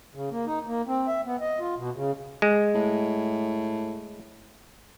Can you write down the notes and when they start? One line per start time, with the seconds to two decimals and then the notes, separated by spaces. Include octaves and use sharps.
0.15 C#3
0.31 A#3
0.46 D#4
0.66 A#3
0.87 C4
1.07 E5
1.26 B3
1.41 D#5
1.59 F4
1.77 B2
1.95 C#3
2.42 G#3
2.74 A2